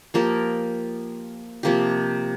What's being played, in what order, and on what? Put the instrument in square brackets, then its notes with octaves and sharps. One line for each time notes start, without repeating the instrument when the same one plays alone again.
[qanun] F3 A#3 G4 A#4
C3 F3 A#3 G4